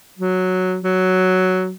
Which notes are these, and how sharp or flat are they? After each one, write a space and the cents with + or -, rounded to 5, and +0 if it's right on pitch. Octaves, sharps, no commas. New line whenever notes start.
F#3 -5
F#3 +5